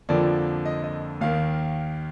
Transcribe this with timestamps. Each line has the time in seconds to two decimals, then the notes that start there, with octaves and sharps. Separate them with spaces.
0.09 F2 D3 F3 A#3 D5
0.65 D#5
0.84 D#5
1.21 D#2 D#3 A#3 F5